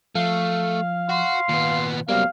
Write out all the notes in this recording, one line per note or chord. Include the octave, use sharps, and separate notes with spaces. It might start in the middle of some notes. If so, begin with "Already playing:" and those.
F3 A3 F5
F#4 C6
A#2 D#3 B3
F#3 G3 A#3 B3 C5 F5